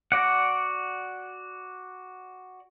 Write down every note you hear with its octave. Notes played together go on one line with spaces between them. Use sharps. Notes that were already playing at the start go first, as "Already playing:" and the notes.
F#4 D5 F#5